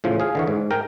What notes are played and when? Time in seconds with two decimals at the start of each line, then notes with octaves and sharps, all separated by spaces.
0.04 A2 C#3 F3
0.20 G#4 F5
0.35 D3 E3 C#5
0.47 G#2
0.71 A#4 G5